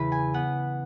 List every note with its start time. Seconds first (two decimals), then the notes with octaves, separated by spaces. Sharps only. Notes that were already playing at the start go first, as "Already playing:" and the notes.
Already playing: E2 C#3 E3 B4
0.12 G#5
0.34 B3 F#5